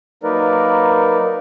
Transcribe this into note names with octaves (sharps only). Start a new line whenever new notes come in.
F#3 A#3 D#4 A#4 B4 D5